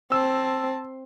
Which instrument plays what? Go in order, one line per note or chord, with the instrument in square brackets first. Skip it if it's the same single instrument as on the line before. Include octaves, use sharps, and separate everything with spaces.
[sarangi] C4 [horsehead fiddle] A5 [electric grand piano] E6